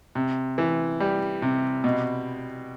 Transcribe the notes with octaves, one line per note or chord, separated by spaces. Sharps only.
C3
E3
G3
C3
B2